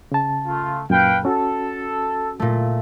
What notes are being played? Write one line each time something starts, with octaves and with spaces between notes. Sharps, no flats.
C#3 A5
A3 F4
F#2 A#2 B4 F5 G5
C#4 F#4 A4
A#2 A3